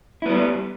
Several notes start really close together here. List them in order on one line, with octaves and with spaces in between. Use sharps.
E4 B3 G3